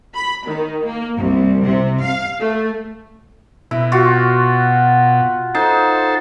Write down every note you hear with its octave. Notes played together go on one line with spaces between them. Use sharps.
B5
D#3
A#3
C2
C3
F5
A3
B2 E4
F4 F#4
D#4 A4 C5 A5